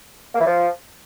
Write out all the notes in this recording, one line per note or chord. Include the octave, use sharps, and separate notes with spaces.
A#3
E3
F3